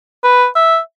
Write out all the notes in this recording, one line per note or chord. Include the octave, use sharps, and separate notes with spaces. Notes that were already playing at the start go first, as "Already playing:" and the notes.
B4
E5